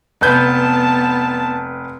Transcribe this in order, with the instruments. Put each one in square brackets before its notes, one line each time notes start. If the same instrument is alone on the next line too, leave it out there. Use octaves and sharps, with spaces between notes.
[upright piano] F1 B4 G6 [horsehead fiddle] B3 A5